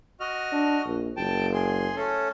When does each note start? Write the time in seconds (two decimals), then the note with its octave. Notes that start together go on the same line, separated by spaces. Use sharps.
0.20 F#4 D#5 F6
0.52 D4
0.85 A#1
1.17 F#1 G5 A5
1.54 G#4 C6
1.96 A3 C#4 A4